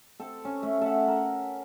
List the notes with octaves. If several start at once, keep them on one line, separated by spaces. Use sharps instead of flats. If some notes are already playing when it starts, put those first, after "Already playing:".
C4 A4
C#4
A3
A4 E5 F#5
A#4